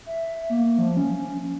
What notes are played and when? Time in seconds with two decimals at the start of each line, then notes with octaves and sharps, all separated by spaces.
0.06 E5
0.50 A#3
0.78 F3
0.97 C#4